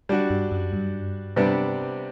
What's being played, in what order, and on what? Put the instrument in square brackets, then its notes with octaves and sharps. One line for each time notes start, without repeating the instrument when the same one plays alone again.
[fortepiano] G3 D4 F#4
[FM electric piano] G2
F#2
G2
[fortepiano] C3 G3 B3 D4